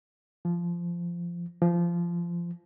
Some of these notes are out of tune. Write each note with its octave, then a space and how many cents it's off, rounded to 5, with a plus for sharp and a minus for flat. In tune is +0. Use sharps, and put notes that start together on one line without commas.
F3 -15
F3 -20